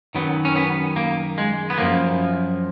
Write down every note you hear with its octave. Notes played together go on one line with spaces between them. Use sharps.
F#2 D#3 F#3 B3
C#4
B3
A#3
G#3
B3
F#2 F3 A#3